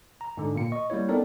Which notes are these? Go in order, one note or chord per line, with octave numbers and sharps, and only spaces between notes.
A#5
G#2 D3
A#2 A#3 C#7
D#5 C#6
G3 A#3 E4 C#5
B3 C4 D#4 A4 A#4 D5